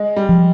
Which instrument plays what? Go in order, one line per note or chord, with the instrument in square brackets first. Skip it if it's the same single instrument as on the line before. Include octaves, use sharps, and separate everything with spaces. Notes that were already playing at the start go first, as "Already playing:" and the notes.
Already playing: [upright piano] G#3
G3
[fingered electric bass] F3